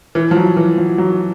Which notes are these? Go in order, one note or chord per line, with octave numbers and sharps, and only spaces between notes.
E3
F3
F#3
E3
F3
F#3